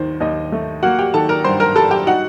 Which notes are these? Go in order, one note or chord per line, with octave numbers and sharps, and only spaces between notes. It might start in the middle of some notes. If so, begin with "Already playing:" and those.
Already playing: D#2 D#3 C5
D#2 D#4 D#5
A3
A#3 F#4 F#5
G4 G5
D#3 A4 A5
A#4 A#5
G2 C5 C6
A#4 A#5
G3 A4 A5
G4 G5
D#4 F#4 F#5